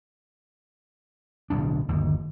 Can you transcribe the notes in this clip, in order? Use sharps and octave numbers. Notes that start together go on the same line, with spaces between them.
D1 B1 D4
G1 D#2